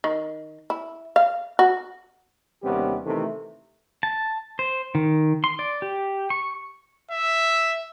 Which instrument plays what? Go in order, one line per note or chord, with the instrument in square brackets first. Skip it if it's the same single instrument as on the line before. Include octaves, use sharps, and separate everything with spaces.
[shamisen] D#3
E4
F5
F#4
[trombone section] D#2 C3 G3 B3 C#4 G4
C3 D#3 E3 A3
[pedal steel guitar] A5
C5
D#3
C6
D5
G4
C#6
[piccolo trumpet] E5